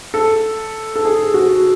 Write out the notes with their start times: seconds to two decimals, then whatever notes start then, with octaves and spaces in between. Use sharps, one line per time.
0.14 A4
0.96 A4
1.05 G#4
1.34 F#4